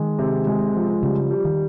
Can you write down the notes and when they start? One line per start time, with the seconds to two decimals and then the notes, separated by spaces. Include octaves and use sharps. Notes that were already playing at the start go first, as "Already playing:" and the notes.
Already playing: D#3 G#3
0.19 C3
0.47 G#3
0.75 F3
1.02 C#3 G3
1.30 G3
1.45 D#3